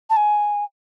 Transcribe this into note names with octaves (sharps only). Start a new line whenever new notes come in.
A5
G#5